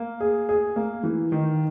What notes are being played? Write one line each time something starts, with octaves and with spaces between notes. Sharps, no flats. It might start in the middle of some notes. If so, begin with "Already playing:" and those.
Already playing: A#3
G#4
G#4
A#3
E3
D#3